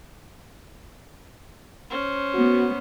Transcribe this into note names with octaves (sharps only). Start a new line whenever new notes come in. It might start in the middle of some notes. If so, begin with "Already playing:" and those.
C#4 C5
B3 F#4